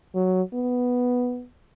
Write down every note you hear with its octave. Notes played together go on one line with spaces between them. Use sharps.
F#3
B3